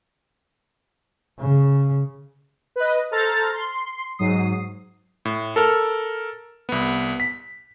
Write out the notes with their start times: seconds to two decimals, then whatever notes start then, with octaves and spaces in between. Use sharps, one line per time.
1.39 C#3
2.76 B4 D#5
3.11 A4 C5 A#5 F6 A6
3.53 C6
4.18 G#2 F#3 D#6 C7
5.25 A2
5.56 A4 A#4 F6
6.69 C2 B3
7.20 B6